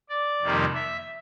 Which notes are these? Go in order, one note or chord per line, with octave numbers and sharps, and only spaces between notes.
D5
F2 C3 D#3 G3 A#3
E5